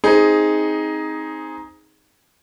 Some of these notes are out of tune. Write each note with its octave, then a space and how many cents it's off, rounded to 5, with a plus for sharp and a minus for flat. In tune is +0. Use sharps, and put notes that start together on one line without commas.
C4 +0 D#4 +10 G#4 +0